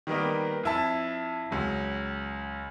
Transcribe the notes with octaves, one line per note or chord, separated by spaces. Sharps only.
D#3 G3 A#3 B3 D#4
F2 E4 A5
C#2 F#3